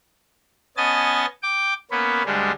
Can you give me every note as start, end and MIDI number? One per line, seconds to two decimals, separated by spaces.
0.77 1.26 59
0.77 1.26 61
0.77 1.26 75
0.77 1.26 80
0.77 1.26 81
0.77 1.26 93
1.43 1.74 79
1.43 1.74 86
1.91 2.23 58
1.91 2.23 59
1.91 2.23 61
1.91 2.23 71
2.26 2.52 38
2.26 2.52 55
2.26 2.52 56
2.26 2.52 62